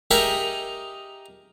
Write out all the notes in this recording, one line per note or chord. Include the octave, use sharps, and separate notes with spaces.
D#4 G4 G#4 A#4 D#5 E5